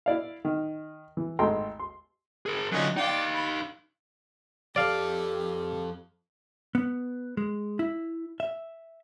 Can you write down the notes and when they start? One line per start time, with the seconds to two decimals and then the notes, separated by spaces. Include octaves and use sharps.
0.06 E4 D5 F5
0.45 D#3
1.17 E3
1.39 G#1 A3 G5 A#5 C6
1.79 C6
2.46 G#4 A#4
2.72 D3 F#3 C#4 D#4 F4
2.97 D#4 D5 F5 G5
3.34 B5
4.76 F2 G4 A4 D5 F5
6.75 B3
7.37 G#3
7.79 E4
8.40 E5